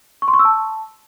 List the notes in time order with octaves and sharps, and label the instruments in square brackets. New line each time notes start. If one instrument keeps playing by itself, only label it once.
[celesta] C#6
C6
C#6
E6
A5